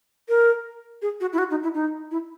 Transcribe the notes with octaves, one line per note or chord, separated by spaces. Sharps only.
A#4
G#4
F#4
E4
F#4
D#4
E4
D#4
E4